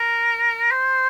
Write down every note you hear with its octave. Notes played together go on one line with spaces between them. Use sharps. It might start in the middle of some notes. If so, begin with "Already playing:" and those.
Already playing: A#4
C5